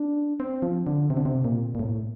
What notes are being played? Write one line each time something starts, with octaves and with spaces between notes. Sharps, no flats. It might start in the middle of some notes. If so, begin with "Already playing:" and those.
Already playing: D4
C4
F3
D3
C3
D3
C3
A#2
A#2
A2